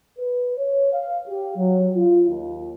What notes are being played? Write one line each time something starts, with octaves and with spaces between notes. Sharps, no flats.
B4
C#5
F5
G4
F#3
F4
D#2